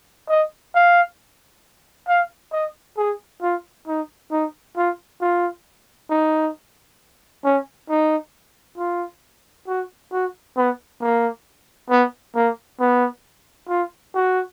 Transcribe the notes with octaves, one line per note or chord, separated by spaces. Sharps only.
D#5
F5
F5
D#5
G#4
F4
D#4
D#4
F4
F4
D#4
C#4
D#4
F4
F#4
F#4
B3
A#3
B3
A#3
B3
F4
F#4